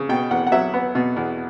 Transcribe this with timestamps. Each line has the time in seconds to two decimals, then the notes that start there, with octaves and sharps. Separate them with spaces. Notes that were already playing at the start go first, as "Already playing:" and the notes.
Already playing: C#3
0.09 B2 G5
0.31 E2 F#5
0.47 F#5
0.52 F#3 E5
0.74 B3
0.95 B2
1.16 E2